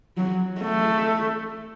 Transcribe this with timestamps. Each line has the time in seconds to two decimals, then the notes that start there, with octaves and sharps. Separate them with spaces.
0.17 F#3
0.60 A3